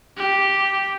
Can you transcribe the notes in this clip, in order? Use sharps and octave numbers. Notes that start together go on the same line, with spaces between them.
G4